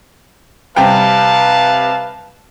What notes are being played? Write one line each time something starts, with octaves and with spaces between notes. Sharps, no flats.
C3 G3 B4 F5 G5 A5